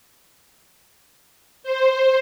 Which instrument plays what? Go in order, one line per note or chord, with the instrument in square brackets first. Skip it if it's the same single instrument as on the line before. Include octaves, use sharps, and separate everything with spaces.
[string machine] C5